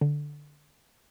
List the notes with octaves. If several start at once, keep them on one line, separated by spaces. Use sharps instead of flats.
D3